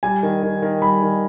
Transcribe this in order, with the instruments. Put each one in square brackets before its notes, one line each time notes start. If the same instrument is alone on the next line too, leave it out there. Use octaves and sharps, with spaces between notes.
[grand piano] G3 G#5
D#3
D#3
D#3
G3 B5
D#3